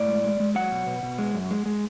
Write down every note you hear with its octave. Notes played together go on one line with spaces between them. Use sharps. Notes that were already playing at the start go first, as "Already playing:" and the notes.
Already playing: A2 D5
G#3
G#3
G#3
F#3 F#5
B2
B2
B2
G#3
F#2
G#3
G#3